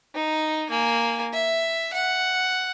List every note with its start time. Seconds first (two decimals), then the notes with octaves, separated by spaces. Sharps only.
0.15 D#4
0.69 A#3 G#5
1.34 E5
1.93 F#5